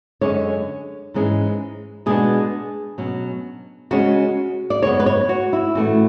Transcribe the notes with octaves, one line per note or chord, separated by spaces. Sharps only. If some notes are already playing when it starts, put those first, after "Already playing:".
F#2 D3 G#3 C#4 C#5
G#2 E3 G#3 C#4
B2 G#3 B3 D4 G#4
B2 F#3 C#4
C#3 G#3 C#4 F#4
D5
F#2 C#3 G#3 B3 C#5
B4
C#5
F#4
E4
A2 E3 A3 C#4 F#4